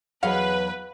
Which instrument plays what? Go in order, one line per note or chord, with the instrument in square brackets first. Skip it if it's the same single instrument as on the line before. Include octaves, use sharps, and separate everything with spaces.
[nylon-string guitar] E2 F#3 C#5 [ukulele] G#4 D#5 F#5 [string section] B4 [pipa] F5